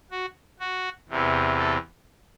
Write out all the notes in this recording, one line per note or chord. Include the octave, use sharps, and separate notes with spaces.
F#4
F#4
E2 C3 E3
A4